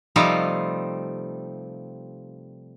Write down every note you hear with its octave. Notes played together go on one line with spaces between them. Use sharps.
C3 F3 G3 A3 D#4 F4